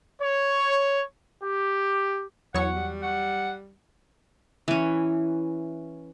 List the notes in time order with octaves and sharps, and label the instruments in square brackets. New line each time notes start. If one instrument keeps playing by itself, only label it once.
[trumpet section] C#5
G4
[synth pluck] E2 F#3 C#6 [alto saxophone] C#5 [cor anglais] F#5
[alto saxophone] G3
[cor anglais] F#5
[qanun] E3 C#4